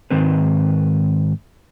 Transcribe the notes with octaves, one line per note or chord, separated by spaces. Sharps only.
G#2 D#3 C4 B4